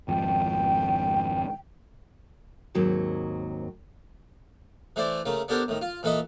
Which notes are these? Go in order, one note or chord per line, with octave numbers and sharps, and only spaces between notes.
G#1 F2 G5
D#2 G#2 F#3 C4
E3 A3 E4 C5 D5
C#3 A3 A#3
B3 D4 G4 A4 A#4 C5
A2 D#3
F4
A#2 E3 A4 B4 D#5